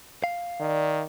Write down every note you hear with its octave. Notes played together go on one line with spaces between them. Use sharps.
F5
D#3 D5